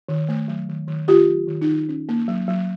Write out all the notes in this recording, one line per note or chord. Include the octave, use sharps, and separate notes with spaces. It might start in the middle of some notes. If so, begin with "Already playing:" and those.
D#3
A3
F#3
D#3
D#3
A3 F4 G4
F#3
D#3
D#4
D#3
C#4
A#3
F#3
F#3